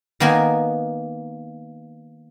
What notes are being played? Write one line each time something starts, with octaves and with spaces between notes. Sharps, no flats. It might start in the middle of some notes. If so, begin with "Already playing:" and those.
D#3 A#3 B3 A#4 G#5